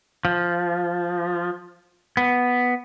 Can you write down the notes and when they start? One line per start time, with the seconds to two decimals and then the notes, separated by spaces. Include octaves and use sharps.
0.25 F3
2.17 B3